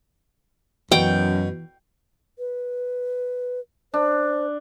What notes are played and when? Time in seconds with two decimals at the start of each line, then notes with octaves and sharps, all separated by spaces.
0.92 F#2 B2 E3 G5
2.39 B4
3.94 D4 C5